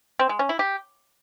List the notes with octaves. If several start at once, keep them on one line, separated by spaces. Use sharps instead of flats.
C4
G#3
C#4
E4
G4